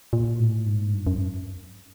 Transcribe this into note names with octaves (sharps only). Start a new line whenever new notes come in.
A#2
A2
G#2
G2
F#2